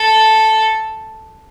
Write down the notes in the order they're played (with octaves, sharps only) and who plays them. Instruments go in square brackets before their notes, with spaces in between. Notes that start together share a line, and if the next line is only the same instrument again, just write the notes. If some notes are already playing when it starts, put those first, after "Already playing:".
Already playing: [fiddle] A4